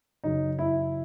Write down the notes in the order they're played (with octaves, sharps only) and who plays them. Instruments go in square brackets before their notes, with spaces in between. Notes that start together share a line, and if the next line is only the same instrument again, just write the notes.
[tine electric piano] F#2 C#3 F#3 [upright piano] D#4
[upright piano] E4